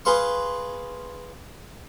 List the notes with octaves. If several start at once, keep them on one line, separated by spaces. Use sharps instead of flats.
G#4 B4 F5 C6 C#6